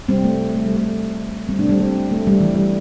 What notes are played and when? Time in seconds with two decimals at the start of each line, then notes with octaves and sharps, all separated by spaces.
0.09 G3 C4
0.24 A3
0.55 A3
0.66 G3
0.76 A3
1.49 G3 C4
1.59 A3 D4
1.69 G3 C4
1.80 G3 C4
2.11 A3
2.27 G3
2.40 E3
2.55 G3